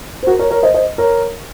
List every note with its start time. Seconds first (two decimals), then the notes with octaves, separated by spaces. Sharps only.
0.23 C5
0.27 F#4 A#4
0.39 A#4 C#5
0.50 A#4 C#5
0.63 C5 D#5
0.74 C5 D#5
0.98 A#4 C#5